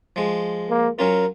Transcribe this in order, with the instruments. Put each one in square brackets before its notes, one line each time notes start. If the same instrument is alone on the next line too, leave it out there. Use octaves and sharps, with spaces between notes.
[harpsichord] F3 G#3
[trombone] A#3
[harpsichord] F#3 C#4 F4 [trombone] A#4